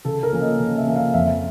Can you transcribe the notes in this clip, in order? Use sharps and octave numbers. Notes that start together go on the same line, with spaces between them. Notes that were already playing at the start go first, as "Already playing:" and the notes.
C#3 A4
A#4
F3 A#3 C#4
D#5
C#3
E5
F3 A#3 C#4
F5
F2 E5